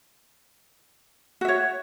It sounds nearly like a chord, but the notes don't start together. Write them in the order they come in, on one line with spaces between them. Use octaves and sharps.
F#4 E5 C#5